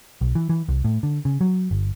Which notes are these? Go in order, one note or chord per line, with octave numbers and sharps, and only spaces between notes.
B1
E3
E3
C2
A2
D3
C#3
F#3
G1